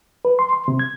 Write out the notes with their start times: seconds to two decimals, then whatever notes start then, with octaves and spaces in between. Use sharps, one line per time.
0.25 B4
0.39 C6
0.53 C6
0.68 C3
0.79 G#6